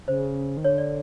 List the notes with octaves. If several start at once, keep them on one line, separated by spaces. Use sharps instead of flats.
C#3 C5
D#3
D3 C#5
D5